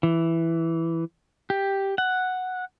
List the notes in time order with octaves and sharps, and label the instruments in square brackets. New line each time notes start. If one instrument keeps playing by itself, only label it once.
[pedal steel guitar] E3
G4
F#5